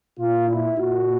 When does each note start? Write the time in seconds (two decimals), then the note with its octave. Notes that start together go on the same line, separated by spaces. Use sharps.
0.18 A#2 F4
0.47 E4
0.78 A#2 F#4